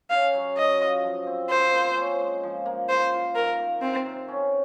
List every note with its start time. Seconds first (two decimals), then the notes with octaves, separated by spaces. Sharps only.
0.10 C#3 F5
0.33 F#3
0.57 F#3 D#5
0.81 F4
1.03 F3
1.27 C4
1.49 F3 C5
1.73 A#3
1.96 C#4
2.20 G#3
2.43 F3
2.66 A#3
2.89 F4 C5
3.13 F4
3.35 D#3 A#4
3.59 A#3
3.82 C3 C4
4.06 C3
4.28 C#4